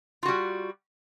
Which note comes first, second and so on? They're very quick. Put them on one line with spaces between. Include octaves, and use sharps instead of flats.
F4 F#4 G3